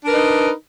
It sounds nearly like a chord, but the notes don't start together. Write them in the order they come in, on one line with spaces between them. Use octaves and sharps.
D4 A#4 B4 D#4